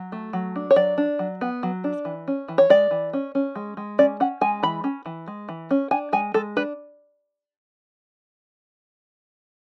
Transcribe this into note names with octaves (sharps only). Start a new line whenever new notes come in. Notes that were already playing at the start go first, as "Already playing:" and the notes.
Already playing: F#3
A3
F#3
D4
C#5
F#3 D5
D4
F#3
B3
F#3
D4
E3
C#4
E3
C#5
G#3 D5
E3
C#4
C#4
G#3
G#3
C#4 D5
C#4 F#5
G#3 G#5
E3 B5
C#4
E3
G#3
E3
C#4
D4 G#5
G#3 G#5
G#3 A4
D4 B4